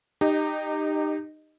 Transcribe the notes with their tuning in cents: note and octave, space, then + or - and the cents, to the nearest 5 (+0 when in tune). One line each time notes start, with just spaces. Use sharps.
D#4 -25 G4 +10 D#5 +0